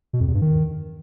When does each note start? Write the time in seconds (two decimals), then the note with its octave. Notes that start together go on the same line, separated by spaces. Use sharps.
0.13 B2
0.20 F2
0.27 E2
0.34 G2
0.42 D#3